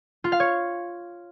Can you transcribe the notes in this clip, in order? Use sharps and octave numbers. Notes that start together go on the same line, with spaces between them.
F4
F5
C#5